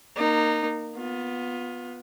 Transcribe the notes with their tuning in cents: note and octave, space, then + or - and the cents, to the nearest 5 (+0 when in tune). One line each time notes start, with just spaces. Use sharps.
A#3 +0 D#4 -20
B3 +0 F4 +25